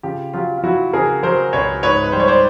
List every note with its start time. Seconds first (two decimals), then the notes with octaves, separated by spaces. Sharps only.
0.03 C#3 F4 G4
0.33 F#3 F4 G4
0.58 F4
0.63 F#3 E4 F#4
0.93 C#3 G#4 A#4
1.23 F#3 A#4 C5
1.53 C#2 B4 C#5
1.83 G#2 B4 C#5
2.04 B4
2.12 G3 C5
2.20 C#5
2.28 C5 D5